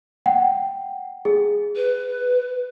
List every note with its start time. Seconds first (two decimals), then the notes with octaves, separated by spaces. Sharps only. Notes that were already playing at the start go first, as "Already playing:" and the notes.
0.26 F#5 G5
1.25 G#4
1.75 B4